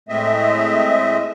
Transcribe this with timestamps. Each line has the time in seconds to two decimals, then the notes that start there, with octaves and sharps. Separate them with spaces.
0.09 A2 G#3 A3 C4 D#5 E5